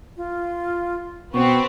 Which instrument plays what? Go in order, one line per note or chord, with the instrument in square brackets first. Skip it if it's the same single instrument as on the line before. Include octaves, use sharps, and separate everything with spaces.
[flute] F4
[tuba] B2 [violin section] B3 C4 [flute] C#6